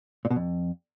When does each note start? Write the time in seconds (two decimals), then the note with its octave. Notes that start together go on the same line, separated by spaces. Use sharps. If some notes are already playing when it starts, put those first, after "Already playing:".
0.25 A#2
0.31 B2
0.36 F2